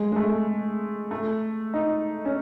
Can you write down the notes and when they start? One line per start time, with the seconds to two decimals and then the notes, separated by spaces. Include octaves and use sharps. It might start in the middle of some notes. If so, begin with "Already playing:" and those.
Already playing: G#3
0.12 G#3
0.16 A3
1.11 A3
1.74 D#4
2.25 C#4